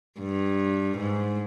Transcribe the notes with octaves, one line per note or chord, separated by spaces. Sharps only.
G2
G#2